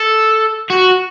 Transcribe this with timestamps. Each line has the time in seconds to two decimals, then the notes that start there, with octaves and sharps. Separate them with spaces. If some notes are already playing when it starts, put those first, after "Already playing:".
Already playing: A4
0.70 F#4